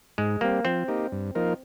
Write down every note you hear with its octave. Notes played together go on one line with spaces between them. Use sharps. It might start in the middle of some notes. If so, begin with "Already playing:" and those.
G#2 G#3
G3 A#3 C4
F3 C4
A#3 D#4 G4
G2
F3 A#3 D#4 A#4